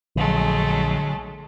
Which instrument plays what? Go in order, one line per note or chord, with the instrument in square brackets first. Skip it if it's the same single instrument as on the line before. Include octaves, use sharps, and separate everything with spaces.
[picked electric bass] A#1 [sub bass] D3 [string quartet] F#3 G#3 A3